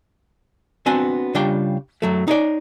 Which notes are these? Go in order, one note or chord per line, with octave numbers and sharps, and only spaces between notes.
B3 C4 D4 F#4 G#5
C#3 G3 D4 F4 G5
F#2 F#3 A3
D#4 C#5 D5